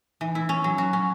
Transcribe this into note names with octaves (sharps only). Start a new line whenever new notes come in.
E3
E4
C#4
F#3
F#4
C#4